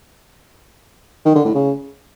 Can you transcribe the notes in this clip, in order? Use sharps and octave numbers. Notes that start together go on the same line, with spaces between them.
D#3
D3
A2
C#3